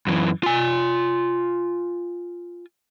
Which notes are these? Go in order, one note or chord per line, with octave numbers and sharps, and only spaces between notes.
F#2 E3
F4 G#5